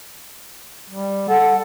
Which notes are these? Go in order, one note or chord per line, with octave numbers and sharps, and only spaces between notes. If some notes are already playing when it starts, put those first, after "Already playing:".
G3
A4 F#5